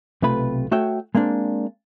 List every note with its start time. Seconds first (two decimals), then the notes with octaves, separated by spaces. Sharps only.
0.22 B1 C3 A3 F4 B4 B5
0.71 A3 F#4 C#5 E5 G5
1.15 G#3 A#3 C4 D4